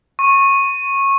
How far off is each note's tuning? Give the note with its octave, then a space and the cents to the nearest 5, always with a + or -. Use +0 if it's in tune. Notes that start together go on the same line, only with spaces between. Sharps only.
C#6 -20